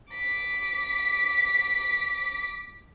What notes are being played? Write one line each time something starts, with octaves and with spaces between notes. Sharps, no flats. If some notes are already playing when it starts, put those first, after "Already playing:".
D6 B6